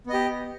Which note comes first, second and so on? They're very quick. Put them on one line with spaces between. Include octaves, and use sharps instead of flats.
B3 D#5 G4